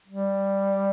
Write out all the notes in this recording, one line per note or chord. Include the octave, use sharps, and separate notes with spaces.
G3